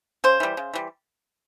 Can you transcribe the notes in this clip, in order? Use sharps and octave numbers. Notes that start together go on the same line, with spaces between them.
C#3 C5
E3 G3
C#3
E3 G3